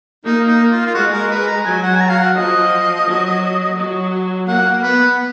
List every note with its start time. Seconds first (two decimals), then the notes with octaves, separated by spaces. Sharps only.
0.25 A#3 D#4
0.47 D#4
0.71 F4
0.87 F4
0.94 G#3 F#4
1.13 A#4
1.31 B4
1.47 A#5
1.65 F#3 G#5
1.82 F#5
1.96 G#5
2.01 A#5
2.09 F5
2.18 F#5
2.36 F3 D#5
3.06 F#3
3.76 F#3
4.47 A#3 F#5
4.82 B3 B4